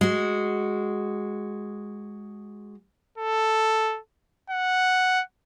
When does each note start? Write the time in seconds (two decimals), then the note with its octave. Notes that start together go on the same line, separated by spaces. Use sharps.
0.01 G#3 F#4
3.18 A4
4.50 F#5